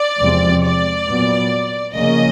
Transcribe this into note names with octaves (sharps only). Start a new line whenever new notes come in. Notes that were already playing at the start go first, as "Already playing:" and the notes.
Already playing: D5
E2 C3 F3 G#3 C4
D5
A#2 F#3 B3
C#3 F3 A#3 C#4 D#5